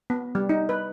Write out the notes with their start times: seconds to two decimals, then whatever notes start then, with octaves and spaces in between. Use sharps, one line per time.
0.10 B3
0.35 G3
0.49 D#4
0.69 B4